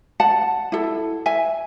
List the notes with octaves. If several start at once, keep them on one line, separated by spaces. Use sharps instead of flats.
F#5 A5
E4 A4
E5 G#5